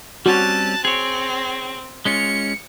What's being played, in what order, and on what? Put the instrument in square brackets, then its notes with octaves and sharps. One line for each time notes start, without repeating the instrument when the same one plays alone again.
[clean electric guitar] G3 C4 C#4 [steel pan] F#4 [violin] A5 F#6
[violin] C4 [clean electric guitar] G#4 C#5
[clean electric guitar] G#3 C#4 F4 [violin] C#7